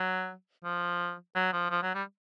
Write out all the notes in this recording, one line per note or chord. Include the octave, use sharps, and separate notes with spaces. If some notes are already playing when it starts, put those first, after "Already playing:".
Already playing: F#3
F3
F#3
F3
F3
F#3
G3